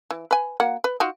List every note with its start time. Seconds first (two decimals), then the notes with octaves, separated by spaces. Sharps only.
0.11 E3
0.31 B4 G#5
0.60 A#3 F#4 F#5
0.84 B4
1.00 D#4 F4 F#4